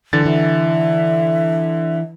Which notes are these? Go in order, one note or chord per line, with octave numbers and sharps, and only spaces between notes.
D3 E3 A6
E3 E5